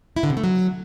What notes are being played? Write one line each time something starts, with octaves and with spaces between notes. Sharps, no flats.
E4
D3
C3
A3
F#3